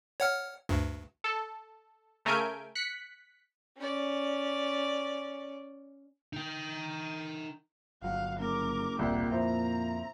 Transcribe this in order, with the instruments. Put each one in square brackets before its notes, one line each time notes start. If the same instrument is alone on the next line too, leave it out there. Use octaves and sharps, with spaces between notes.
[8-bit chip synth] C#5 F#5 F6
D2 G2
[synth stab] A4
C#3 A3 A#4 G#5 G6 D7
F#6 B6 C#7
[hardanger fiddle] C#4 D5
[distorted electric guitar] D#4 G5
[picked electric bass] G1 F#3 [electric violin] F5 F#5
[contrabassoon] F#1 [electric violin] A#4 D6
[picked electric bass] E1 [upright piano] C2 [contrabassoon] A#2 [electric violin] G4 F#5
[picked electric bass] F2 [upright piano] E4 C5 [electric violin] A#5